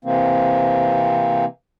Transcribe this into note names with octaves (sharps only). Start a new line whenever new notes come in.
C3 E3 A#3 C4